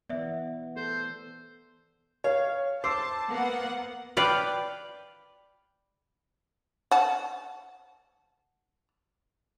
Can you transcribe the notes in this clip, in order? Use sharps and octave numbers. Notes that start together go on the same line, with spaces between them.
E3 B3 D5 E5
A4 C5
C#5 F5
C5 A5 D6 E6
A#3 B3 F#5
B4 D5 F5 G5
F#5 A5